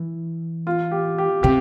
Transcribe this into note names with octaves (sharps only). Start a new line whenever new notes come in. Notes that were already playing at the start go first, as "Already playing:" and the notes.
Already playing: E3
F4
G4
G4
C3 G4